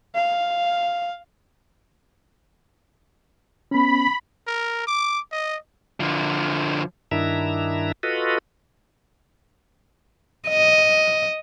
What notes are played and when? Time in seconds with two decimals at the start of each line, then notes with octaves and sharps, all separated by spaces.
0.15 F5
3.71 B3 C#4 B5
4.47 A#4
4.87 D6
5.32 D#5
6.00 D3 F3
7.11 G2 D#3 D4 E4 E5 A#5
8.03 F4 F#4 A4 B4 D#5
10.49 D#5